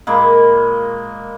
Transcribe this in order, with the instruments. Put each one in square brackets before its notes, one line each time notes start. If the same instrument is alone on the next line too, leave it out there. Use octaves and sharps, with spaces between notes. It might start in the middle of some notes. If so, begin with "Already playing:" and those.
[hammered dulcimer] A#2 G#3 A#3 B5